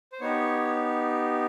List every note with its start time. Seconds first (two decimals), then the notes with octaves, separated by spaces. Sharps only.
0.12 C5
0.20 B3 D#4 G4 C#5